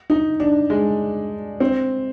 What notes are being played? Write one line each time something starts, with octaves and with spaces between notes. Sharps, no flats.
D#4
D4
G#3
C4